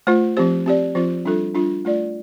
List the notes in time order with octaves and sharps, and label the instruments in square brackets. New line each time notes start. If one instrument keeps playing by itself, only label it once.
[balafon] A3 F4 C5
F3 C4 G4 C5
C4 G4 D5
F3 C4 F4 C5
G3 D4 F4 A4
G3 D4 F4
A3 F4 D5